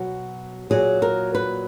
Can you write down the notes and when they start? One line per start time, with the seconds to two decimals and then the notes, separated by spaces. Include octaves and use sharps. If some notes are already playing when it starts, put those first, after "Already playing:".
Already playing: B2 F#3 F#4
0.70 A#2 F#3 G#4
1.02 A#4
1.35 B4